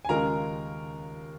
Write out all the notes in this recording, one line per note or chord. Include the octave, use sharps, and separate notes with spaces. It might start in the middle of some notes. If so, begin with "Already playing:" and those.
G#5
D#2 C#3 G#3 F4 A#4 A#5